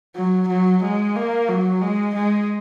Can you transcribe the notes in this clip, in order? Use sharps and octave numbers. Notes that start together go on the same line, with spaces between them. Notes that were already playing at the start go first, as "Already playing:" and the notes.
F#3
F#3
G#3
A#3
F#3
G#3
G#3